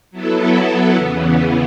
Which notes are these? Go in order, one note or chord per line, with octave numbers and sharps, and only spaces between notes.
F#3 B3 E4 A4
E2 C#3 E3 B3